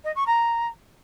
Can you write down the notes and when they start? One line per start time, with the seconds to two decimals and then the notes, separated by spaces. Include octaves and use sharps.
0.04 D#5
0.15 C#6
0.27 A#5